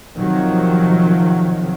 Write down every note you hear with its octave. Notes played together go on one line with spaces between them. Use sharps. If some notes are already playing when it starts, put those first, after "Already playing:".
C3 D#3 F3 F#3